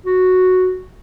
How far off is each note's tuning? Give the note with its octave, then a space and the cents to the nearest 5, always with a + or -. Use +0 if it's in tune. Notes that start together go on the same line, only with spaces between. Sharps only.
F#4 -5